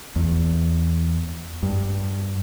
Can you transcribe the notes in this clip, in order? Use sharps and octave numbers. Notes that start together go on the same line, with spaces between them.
E2
G2